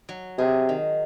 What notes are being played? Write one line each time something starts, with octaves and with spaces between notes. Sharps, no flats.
F#3
C3 G#4
D#3